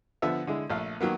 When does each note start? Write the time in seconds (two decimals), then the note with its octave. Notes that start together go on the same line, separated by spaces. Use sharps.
0.22 D3 F3 B3 E5
0.47 D3 G#3 E4
0.70 A#1 A3 F5
1.01 D#3 F#3 A#3 B3